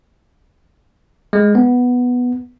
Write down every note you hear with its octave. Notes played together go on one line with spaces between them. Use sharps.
G#3
B3